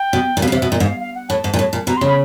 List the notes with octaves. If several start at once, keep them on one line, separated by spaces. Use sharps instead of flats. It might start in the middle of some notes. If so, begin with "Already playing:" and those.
Already playing: G5
B2
A#2
B2 F5
C#3
C3
E5
B2
A#2 D#5
G#2
F5
F5
F#5
A2 A5
G#2
A#2
A2
A#2
B2 A#5
C6
C#3
B5